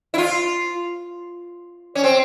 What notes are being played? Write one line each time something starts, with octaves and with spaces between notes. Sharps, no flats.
E4
F4
C#4
C4